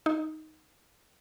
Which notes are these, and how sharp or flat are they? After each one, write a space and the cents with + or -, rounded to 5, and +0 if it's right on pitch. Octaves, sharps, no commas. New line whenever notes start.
D#4 +0